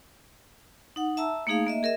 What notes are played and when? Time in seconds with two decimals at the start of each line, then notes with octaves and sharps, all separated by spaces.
0.96 D#4 F#5
1.17 E5 A5 A#5 E6
1.47 A3 A#3 D#4 G#4 F5
1.66 A#3 D#5 E5
1.83 G#4 A#4 D#5 E5